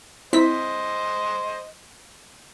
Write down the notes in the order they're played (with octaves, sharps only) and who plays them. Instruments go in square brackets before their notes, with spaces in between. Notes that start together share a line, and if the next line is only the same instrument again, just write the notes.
[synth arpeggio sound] C4 E4 B6 [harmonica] C5 D#5